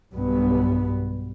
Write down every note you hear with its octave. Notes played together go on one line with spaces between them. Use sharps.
B1 G2 B3